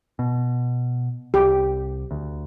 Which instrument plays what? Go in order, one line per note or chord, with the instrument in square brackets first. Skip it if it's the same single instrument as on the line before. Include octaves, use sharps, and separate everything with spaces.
[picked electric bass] B2
[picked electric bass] C2 [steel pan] G4
[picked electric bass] D2